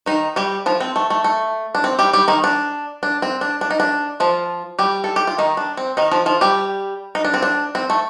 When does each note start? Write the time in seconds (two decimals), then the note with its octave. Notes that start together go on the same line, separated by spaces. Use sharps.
0.06 D#3 D#4
0.36 G3 G4
0.66 F3 F4
0.80 C4
0.96 A3
1.10 A3
1.24 A3
1.75 D4
1.84 C4
1.99 G3 G4
2.13 G3 G4
2.28 D#3 D#4
2.44 D4
3.03 D4
3.22 C4
3.41 D4
3.61 D4
3.71 D#4
3.80 D4
4.20 F3 F4
4.79 G3 G4
5.04 A4
5.16 G4
5.27 F4
5.38 D#3 D#4
5.57 D4
5.77 C4
5.97 D#3 D#4
6.11 F3 F4
6.26 F3 F4
6.41 G3 G4
7.15 D#4
7.25 D4
7.34 C4
7.42 D4
7.75 C4
7.90 A3